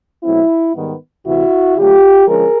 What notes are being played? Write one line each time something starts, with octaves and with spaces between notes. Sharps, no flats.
B2 F#3 A3 C4 E4
G#2 D#3 G3 B3
D2 C3 E3 E4 F#4
D3 F#3 A3 F4 G4
D3 F3 G#3 C#4 G#4 A#4